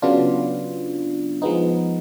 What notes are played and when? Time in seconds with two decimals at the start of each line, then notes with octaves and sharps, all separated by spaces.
0.02 C#3 F#3 B3 D4 F4
1.42 F3 G#3 B3 D#4